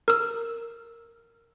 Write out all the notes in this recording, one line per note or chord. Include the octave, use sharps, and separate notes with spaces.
A#4 E6